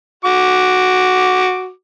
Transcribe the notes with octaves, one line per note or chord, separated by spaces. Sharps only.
F#4 D6